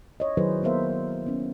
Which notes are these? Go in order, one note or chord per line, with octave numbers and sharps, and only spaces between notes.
C#5 D#5
D#3 F#3 E4 G#4 B4 C5
A#3 B3 A#4 C5 E5 F5
B3 C#4